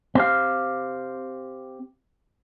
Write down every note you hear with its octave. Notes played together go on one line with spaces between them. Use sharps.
C4 G4 F5